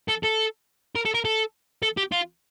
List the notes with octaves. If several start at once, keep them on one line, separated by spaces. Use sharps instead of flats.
A4
A4
A#4
A4
A#4
A4
A4
G4
F4